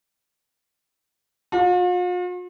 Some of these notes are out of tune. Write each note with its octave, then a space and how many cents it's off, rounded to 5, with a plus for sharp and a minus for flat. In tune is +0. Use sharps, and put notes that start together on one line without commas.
F4 +45